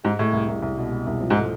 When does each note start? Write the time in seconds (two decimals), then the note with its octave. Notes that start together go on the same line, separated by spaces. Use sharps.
0.04 G#2 G#3
0.19 A2 G#3
0.33 C2
0.48 C2
0.62 C2
0.77 B2
0.92 B2
1.07 C2
1.21 F3
1.30 G#2
1.35 A3